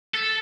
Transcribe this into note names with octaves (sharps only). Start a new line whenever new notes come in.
A4